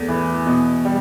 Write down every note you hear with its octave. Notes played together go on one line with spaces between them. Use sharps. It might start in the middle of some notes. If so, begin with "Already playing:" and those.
Already playing: E2 A3
E3
B2
G3